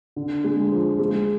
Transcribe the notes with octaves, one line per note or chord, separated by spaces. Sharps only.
D3
G#3
F3
G#3